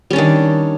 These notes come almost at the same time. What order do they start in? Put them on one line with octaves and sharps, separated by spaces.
G3 C#4 D4 D#3